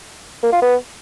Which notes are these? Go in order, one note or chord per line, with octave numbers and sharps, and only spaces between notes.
A#3
F4
B3